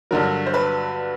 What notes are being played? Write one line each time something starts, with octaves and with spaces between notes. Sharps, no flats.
G2 D3 F#3 A#4
C5
B4